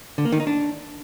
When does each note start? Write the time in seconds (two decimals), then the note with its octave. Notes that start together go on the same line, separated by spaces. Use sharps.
0.18 D3
0.25 A#3
0.32 D#3
0.40 D#4
0.47 D4